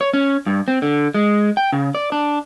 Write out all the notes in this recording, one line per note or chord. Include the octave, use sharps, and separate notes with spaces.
C#5
C#4
G2
C4
D3
G#3
G5
C#3
D5
D4